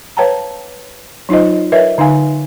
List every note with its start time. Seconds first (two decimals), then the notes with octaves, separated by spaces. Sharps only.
0.17 B4 C#5 F5 G5 A5 A#5
1.29 F#3 D#4 F4 C5 D#5
1.72 A#4 B4 C#5 D#5 E5
1.98 D3 D#4 F5 G#5